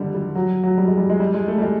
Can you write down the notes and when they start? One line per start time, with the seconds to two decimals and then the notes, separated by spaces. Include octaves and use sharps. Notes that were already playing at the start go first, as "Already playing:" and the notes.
Already playing: D3 D#3 G3
0.15 G3
0.35 F#3
0.64 F#3
0.78 G3
0.87 G#3
0.97 G3
1.10 G#3
1.20 G3
1.34 G#3
1.48 A3
1.58 G3
1.62 G#3